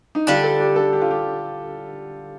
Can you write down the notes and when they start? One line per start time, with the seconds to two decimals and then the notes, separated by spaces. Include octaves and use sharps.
0.15 D#4
0.27 D3 G3 D4 F4
0.44 A4
0.60 G4
0.76 A4
0.93 G4
1.01 F4
1.11 G4